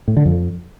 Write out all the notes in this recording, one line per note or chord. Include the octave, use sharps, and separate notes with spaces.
A2
D3
F2